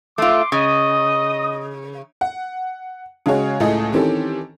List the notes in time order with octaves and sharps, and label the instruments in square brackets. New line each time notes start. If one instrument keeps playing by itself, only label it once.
[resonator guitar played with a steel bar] A3 F4 [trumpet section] C6 D6
[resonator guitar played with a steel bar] C#3 [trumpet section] D#5 D#6
[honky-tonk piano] F#5
C#3 G#3 F#4 G#4 C#5
C#2 A2 A3 G#4 A4 D#5
D#3 E3 C4 C#4 G4 A4